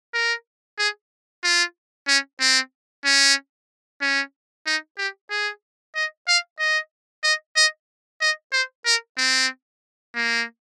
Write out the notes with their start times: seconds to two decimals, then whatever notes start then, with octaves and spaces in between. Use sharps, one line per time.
0.14 A#4
0.78 G#4
1.44 F4
2.08 C#4
2.40 C4
3.05 C#4
4.02 C#4
4.67 D#4
4.98 G4
5.30 G#4
5.95 D#5
6.28 F5
6.59 D#5
7.24 D#5
7.56 D#5
8.21 D#5
8.53 C5
8.86 A#4
9.18 C4
10.15 A#3